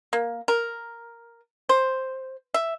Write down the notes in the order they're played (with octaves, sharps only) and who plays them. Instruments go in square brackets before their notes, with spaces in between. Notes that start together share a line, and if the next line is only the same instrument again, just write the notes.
[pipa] A#3
A#4
C5
E5